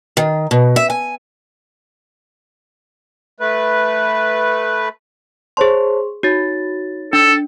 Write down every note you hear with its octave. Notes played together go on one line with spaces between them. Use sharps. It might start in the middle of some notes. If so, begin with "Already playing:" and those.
D#3
B2
E5
G#5
A3 B4
G#4 C5 C#5 A5 C6
D#4 F#4 C#5 A6
D4 A4